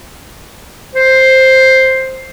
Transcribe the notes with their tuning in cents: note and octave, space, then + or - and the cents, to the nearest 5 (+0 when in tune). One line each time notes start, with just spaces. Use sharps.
C5 +5